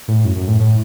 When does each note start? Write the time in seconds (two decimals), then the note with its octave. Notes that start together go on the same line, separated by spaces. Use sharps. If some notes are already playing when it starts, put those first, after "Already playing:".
0.08 A2
0.25 F#2
0.36 F#2
0.48 A2
0.60 A2